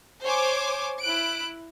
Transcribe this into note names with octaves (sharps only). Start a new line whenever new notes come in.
C5 C#5 G#5 D6
E4 F#6 D7